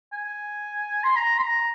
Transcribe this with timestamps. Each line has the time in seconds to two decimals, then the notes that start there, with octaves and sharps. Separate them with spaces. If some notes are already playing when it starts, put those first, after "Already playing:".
0.13 G#5
1.03 C6
1.16 A#5
1.38 C6
1.42 A#5